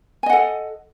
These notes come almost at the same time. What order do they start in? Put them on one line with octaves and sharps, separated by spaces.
G#5 D#5 F#5 A4